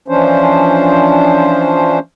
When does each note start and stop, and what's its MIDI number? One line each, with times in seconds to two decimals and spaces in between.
0.08 1.99 52
0.08 1.99 53
0.08 1.99 61
0.08 1.99 62
0.08 1.99 72